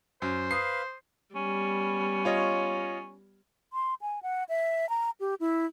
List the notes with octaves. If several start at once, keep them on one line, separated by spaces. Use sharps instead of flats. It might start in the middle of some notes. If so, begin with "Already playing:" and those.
F#2 C5
B4 F5 D#6 C7
G3 B3 C#4
F4 C#5 D#5
C6
G#5
F#5
E5
A#5
G4
E4